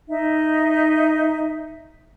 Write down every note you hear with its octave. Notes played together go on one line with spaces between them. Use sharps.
D#4 E5